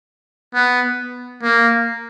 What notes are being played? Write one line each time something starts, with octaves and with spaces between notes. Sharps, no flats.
B3
A#3